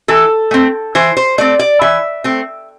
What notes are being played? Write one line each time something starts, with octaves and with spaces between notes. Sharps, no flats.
E3 A4
A3 C4
E3 C5
C5
A3 C4 D5
D5
E3 E5
A3 C4